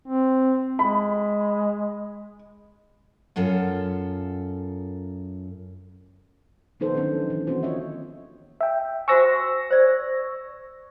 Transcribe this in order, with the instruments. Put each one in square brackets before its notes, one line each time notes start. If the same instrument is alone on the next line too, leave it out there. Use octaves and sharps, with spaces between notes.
[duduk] C4
[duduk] G#3 [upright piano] B5
[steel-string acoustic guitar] F#2 F4 A4 F#5
[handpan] D#3 F3 B3 D#4 A4 C5
D#3 F#3 B3 C#4 D4
E3
D#3 A#3 C4 C#4 F#4 C5
A#3 F4 C#5 D#5 E5
[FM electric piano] E5 G5
[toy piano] F#4 C5 G#5 [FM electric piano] C#6 E6 A#6
[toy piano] C5 D5